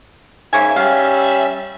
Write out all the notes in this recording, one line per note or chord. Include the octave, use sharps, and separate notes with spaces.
G#2 A#3 C#4 E5 G#5
G3 C#4 F5